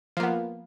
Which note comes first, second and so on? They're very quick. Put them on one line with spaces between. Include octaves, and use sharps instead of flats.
F3 A#3 B3